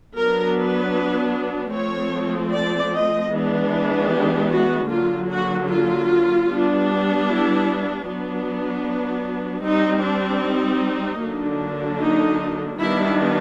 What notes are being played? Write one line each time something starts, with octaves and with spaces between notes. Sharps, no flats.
F#3 B3 D4 A#4
B4
F3 A3 C4 C#5
D5
D#5
E3 G#3 B3 D4
G4
F#4
D3 F#3 A#3 F4
F#4
F4
G3 B3 D4
E4
F#3 B3 D4
G3 C4 D#4
D4
D#4
D3 F#3 A#3 D4
D#4
D#3 G3 B3 D4 E4